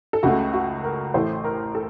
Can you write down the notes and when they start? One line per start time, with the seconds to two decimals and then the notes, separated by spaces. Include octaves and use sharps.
0.13 A4
0.23 C#2 C#3 A3 F#4
0.53 F#4
0.84 A#4
1.14 A1 A2 A3 C5
1.44 A#4
1.75 A4